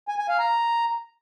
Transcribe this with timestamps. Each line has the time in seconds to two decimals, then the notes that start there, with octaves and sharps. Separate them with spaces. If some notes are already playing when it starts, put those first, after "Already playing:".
0.08 G#5
0.19 G#5
0.29 F5
0.39 A#5